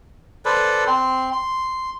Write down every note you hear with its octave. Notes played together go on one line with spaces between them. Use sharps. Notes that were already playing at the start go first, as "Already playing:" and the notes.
A4 B4 C5 D5
C4 C6
C6